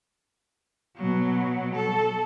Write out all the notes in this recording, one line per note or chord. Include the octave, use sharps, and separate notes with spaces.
B2 F#3
A4